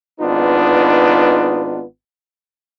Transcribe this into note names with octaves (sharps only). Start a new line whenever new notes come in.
G#1 B3 D4 D#4 F4 B4